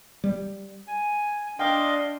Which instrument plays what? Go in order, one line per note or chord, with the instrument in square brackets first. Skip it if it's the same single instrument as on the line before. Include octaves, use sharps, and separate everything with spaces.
[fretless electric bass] G3
[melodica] G#5
[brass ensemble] D4 [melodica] D#5 F5 C6 [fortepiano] G5